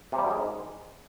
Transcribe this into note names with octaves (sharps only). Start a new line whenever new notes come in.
C3
G3
F#2
G#3
G#2